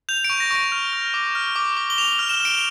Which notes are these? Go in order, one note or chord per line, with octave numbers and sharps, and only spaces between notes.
G6 F7
D7
C#6
A#6
C#6 D7
F6
F6
D6
F6
D6
D6
G7
D6 F7
F6
E7
F6
D7